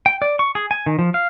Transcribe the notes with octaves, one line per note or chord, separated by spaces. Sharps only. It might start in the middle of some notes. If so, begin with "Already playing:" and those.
G5
D5
C#6
G#4
G#5
D#3
F3
F5